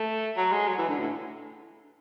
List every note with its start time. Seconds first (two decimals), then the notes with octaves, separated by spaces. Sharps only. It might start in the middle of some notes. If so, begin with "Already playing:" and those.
Already playing: A3
0.36 F#3
0.52 G#3
0.68 F#3
0.78 E3
0.88 D3
0.98 A2